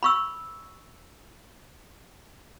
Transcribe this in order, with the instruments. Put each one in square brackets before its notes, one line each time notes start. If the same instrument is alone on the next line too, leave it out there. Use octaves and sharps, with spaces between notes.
[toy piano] B5 C#6 E6